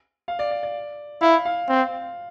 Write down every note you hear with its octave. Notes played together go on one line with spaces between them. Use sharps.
F5
D5
D5
D5
E4 F5
F5
C4